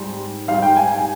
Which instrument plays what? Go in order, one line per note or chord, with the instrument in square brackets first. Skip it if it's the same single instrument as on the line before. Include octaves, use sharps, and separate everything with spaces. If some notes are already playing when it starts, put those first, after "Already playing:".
Already playing: [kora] G#2 G3 C4
[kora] G#2 G3 C4 [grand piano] F5
[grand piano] G5
G#5
G#5